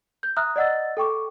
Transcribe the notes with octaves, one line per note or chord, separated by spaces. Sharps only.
G6
E5 A#5 D#6 F6 F#6
D5 D#5 F#5 E6 A6
A4 G5 C#6 D6